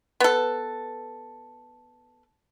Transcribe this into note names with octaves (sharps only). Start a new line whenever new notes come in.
B3 A4